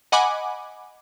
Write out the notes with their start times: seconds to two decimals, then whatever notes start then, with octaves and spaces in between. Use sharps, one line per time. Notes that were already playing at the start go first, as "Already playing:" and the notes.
0.12 D#5 F#5 G#5 B5 D6